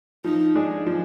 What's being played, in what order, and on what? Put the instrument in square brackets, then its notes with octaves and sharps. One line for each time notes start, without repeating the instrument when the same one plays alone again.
[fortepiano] F3 [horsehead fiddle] D#4
[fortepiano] G#3 D4 G#4
F3